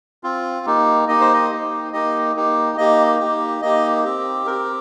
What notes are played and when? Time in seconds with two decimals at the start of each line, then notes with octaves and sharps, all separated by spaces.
0.24 C4 F4
0.66 A#3 D#4 G4
1.08 A#3 D#4 G4 D#5
1.20 C5
1.33 D#5
1.50 A#3 D#4 G4
1.93 A#3 D#4 G4 D#5
2.35 A#3 D#4 G4
2.77 A#3 D#4 G4 D#5
3.19 A#3 D#4 G4
3.62 A#3 D#4 G4 D#5
4.04 C4 G4
4.47 C4 G4 A#4